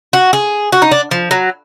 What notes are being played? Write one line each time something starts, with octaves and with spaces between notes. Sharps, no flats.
F#4
G#4
F#4
D#4
D4
F3
F#3